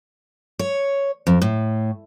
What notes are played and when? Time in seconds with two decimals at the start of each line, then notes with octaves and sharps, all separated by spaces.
0.59 C#5
1.27 F2
1.42 A2